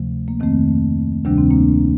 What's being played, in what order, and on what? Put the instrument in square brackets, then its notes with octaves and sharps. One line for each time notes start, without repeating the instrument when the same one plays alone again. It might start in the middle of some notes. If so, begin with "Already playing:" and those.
Already playing: [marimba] D2 C3 F3 A3
A#3
F2 D#3 A3 C4
D2 C3 D#3 G3 D4
C4
A#3 D4